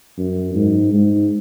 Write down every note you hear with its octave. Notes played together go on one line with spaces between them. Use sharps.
F#2
G#2
G#2